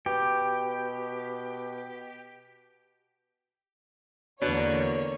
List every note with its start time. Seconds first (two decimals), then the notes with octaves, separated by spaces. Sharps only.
0.06 B2 G4
4.42 E2 B2 D3 A#3 D4 C#5